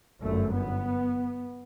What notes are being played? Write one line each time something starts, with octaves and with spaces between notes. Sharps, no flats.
G1 F#2 A3
B3